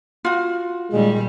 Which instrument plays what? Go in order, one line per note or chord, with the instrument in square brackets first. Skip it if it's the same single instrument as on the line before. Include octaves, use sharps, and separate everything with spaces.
[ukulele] F4 F#4
[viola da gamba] A#2 D#3 G3 [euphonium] G#3